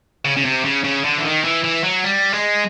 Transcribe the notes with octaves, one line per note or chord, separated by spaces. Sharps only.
C#3
C#3
C3
C#3
C#3
D3
E3
D#3
E3
E3
F#3
G3
G#3